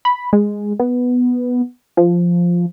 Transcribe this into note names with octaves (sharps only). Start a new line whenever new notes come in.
B5
G#3
B3
F3